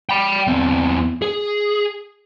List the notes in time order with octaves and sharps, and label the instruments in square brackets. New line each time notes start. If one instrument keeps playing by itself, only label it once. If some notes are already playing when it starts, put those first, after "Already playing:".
[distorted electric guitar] G5 B5
E2 C4
G#4